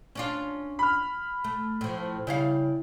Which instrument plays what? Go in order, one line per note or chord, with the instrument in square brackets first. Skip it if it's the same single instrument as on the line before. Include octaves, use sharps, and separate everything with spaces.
[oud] C#4 D4 F4
[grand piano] B5 F6
[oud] A3
A2 F3
[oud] C#3 G3 F5 [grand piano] E4